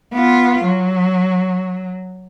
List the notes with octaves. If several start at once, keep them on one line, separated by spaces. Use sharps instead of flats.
B3 F4
F#3